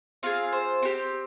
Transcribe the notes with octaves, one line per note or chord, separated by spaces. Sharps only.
C4 F4 G#4 F5
C5
C4 G4